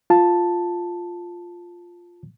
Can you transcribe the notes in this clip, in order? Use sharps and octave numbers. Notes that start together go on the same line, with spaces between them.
F4 A5